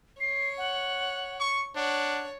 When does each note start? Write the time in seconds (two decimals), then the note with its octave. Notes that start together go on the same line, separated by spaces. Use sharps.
0.20 C#5 C7
0.58 F#5
1.40 C#6
1.76 D4 C#5 F#5